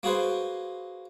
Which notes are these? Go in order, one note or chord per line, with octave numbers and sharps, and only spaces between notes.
A#3 F#4 G#4 B4 C5